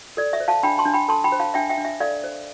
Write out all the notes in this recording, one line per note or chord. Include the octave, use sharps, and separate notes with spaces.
A4 D5
E5
C5
F5 A5
D4 G5 B5
A5 C6
D4
G5 B5
A4 A5 C6
G5 B5
C5
F5 A5
D4 E5 G5
E5 G5
D4
E5
A4 D5 F5
C5